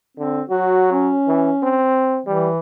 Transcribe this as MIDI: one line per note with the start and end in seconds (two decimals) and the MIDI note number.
0.17 0.41 50
0.17 0.42 60
0.50 1.14 54
0.50 0.88 66
0.92 1.78 61
1.28 1.51 52
1.63 2.21 60
2.26 2.59 52
2.26 2.49 55